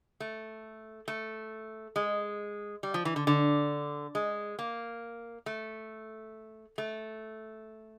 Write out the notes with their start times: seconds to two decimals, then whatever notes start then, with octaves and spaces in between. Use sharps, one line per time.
0.20 A3
1.08 A3
1.96 G#3
2.83 G3
2.94 F3
3.05 E3
3.16 D3
3.27 D3
4.15 G#3
4.59 A#3
5.46 A3
6.78 A3